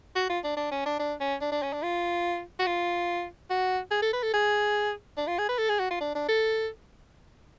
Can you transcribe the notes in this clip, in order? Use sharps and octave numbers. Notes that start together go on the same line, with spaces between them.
F#4
F4
D4
D4
C#4
D4
D4
C#4
D4
D4
C#4
D4
F4
F#4
F4
F#4
G#4
A4
B4
A4
G#4
D4
F4
G#4
B4
A4
G#4
F#4
F4
D4
D4
A4